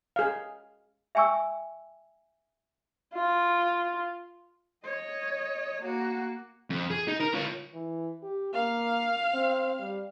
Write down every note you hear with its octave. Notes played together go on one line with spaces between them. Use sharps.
G#4 F5
E5 G5 G#5 C#6 E6
F4
C#5 D#5
A#3 F#4
F2
G#4
D#4
A#4
F4 C#5
E3
G4
A#3 F5
C4
G3